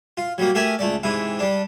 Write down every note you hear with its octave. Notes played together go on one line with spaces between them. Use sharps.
F4
F#3 G3 A#3
A3 G4 A#4 E5 G#5
C#2 A3 D5
G#2 C3 E3 E4
G3 D4